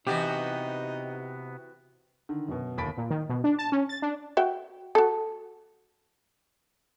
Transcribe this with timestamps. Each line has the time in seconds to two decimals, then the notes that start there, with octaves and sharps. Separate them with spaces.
0.07 C3 E3 B3 D#4 F#4 G4
2.29 D3 D#3
2.48 F#2 B2
2.77 G1 D#2 B5 A6 B6 D7
2.97 A#2
3.10 D#3
3.29 B2
3.44 D4
3.59 A5
3.72 C#4
3.89 A6
4.02 D4
4.37 F#4 E5 G5
4.95 F#4 A4